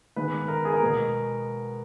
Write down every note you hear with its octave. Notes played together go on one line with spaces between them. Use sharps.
D#3 G#3 B3 B4
A#4
G#4
A#4
B2 G#3 B3